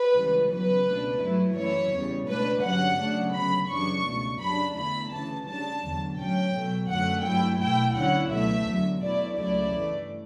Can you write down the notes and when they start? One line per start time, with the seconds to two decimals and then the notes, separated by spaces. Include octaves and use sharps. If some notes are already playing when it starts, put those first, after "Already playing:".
Already playing: B4
0.15 C#2 C#3 E3 G3
0.49 E2 C#3 F#3 B4
0.86 C#2 B2 A3 D4
1.21 G2 F#3 A3 E4
1.56 F#2 E3 A3 E4 C#5
1.92 E2 C#3 G3
2.27 C#2 B2 A3 D4 B4
2.63 G2 D3 F#3 C#4 F#5
2.98 C#3 F#3 A3 D4
3.33 D2 C#3 F#3 B3 B5
3.69 F#2 C#3 E3 G3 D4 C#6
4.05 C#2 B2 A3
4.40 F#2 C#3 G3 D4 B5
4.75 E2 D3 A3 E4 B5
5.11 D2 C#3 E3 A5
5.46 C#3 G3 D4 A5
5.82 E2 D3 F#3
6.17 A2 F#3 C#4 G5
6.53 B2 F#3 A3
6.89 F#2 D3 F#3 A3 F#5
7.23 G2 F#3 A3 E4 G5
7.60 B2 A3 E4 G5
7.95 D2 D3 F#3 C#4 E4 F#5
8.31 C#2 B2 F#3 A3 E5
8.66 E2 D3 F#3
9.01 B2 A3 E4 D5
9.36 C#2 C#3 F#3 A3 E4 D5
9.73 G2 E3 A3